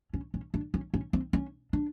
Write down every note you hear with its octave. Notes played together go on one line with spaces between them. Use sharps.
C#4
C#4
D4
C#4
C#4
C4
C#4
D4